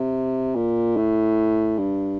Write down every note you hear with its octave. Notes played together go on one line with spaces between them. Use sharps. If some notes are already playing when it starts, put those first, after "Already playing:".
Already playing: C3
A#2
A2
G2